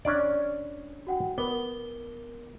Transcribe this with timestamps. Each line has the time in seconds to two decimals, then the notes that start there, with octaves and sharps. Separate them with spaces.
0.05 C#4 D4 D5
1.07 F#4 F#5 G5
1.38 B3 A#4 D6 G7